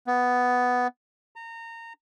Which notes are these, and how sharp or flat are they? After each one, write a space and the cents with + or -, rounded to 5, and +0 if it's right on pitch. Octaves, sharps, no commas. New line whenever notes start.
B3 +5
A#5 -25